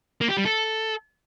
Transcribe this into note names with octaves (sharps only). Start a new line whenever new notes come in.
A#3
G4
G3
A4